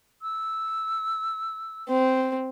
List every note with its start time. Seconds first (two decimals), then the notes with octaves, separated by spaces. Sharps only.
0.22 E6
1.89 C4